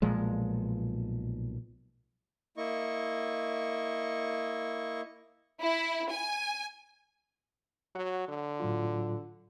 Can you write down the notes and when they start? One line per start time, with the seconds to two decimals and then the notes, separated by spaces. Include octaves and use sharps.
0.02 B1 A#2 F3 G#3
2.57 A#3 E4 D#5 C#6
5.61 E4
6.11 G#5
7.95 F#3 F#5
8.29 D3
8.60 A2 F#3 F4